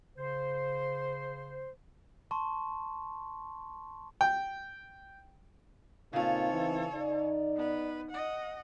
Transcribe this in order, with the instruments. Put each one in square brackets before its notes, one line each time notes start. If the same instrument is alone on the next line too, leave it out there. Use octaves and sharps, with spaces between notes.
[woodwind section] C#3 C5
[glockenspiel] A5 C6 C#6
[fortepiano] G5
[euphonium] A#2 [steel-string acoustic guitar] C#3 F4 [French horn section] C4 D#4 [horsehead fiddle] A4 C#5
[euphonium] E3
[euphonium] D#4 [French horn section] D5
[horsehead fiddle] B3 B4
D#5 F#5